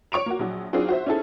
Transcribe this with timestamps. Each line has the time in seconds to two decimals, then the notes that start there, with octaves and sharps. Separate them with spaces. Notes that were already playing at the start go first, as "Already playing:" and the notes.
0.12 C#5 C#6 D7 F7
0.26 A#3 F#4
0.39 A#1 F#3
0.73 F#3 C4 D4 D#4 F4 G#4
0.88 F#4 C5 E5
1.06 C#4 D#4 E4 G#4 A4